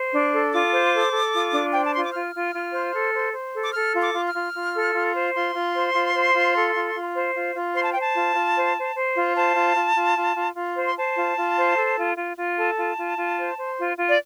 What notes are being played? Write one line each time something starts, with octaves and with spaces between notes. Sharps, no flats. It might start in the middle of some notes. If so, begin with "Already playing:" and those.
Already playing: C5
D4
A4
F4 D6
C5
A4
A4
F4
D4
C5 G5
A5
F4 C6
D6
F4 F6
F4
F4
C5
A4
C5
C5
A4
D6
A4 F6
F4
D6
F4
F6
F4
F4
A4
F4
C5
F4 C6
F4
C5
F4
C5
F4
A4
F4
F4
C5
F4
F4
C5 C6
A5
C5 G5
A5
F4
F4
C5
C5
C5
F4
C5 A5
F4
F4
F4
F4
F4
F4
C5
C6
C5 A5
F4
F4
C5
A4
F4
F4
F4
A4 A5
F4
F4
F4
C5
C5
F4
F4
D5